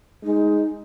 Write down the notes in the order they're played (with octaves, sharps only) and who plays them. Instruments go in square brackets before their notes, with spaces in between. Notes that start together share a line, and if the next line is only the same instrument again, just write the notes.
[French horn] G#3 [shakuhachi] D#4